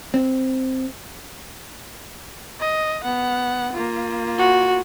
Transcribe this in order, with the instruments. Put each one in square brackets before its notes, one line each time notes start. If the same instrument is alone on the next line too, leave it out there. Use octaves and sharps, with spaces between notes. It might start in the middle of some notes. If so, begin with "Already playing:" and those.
[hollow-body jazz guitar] C4
[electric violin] D#5
B3 F#5
A#3 F4
[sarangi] F#4